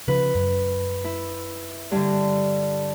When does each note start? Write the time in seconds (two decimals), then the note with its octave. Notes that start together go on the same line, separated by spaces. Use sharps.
0.08 C#3 F3 B4
0.35 F#2
1.04 E4
1.91 G2 D3